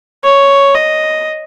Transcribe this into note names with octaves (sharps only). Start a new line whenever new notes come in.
C#5
D#5